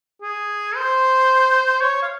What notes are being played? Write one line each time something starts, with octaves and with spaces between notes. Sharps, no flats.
G#4
C5
C#5
F5